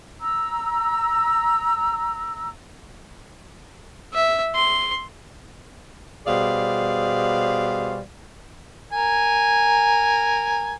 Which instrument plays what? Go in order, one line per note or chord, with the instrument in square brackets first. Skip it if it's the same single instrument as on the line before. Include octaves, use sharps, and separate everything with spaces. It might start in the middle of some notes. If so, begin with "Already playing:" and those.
[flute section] A#5 E6
[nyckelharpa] E5
C6
[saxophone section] B2 G3 G#4 C5 D5 F5
[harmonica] A#4 G#5